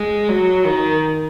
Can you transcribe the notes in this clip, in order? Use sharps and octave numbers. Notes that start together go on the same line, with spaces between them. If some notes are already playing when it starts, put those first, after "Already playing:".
Already playing: G#3
F#3
D#3